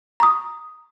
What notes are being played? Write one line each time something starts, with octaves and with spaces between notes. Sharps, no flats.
A#5 C#6 D#6